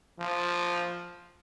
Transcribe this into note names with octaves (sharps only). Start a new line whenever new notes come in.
F3